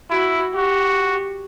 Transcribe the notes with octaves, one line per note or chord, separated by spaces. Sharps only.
E4 F#4
F#4 G4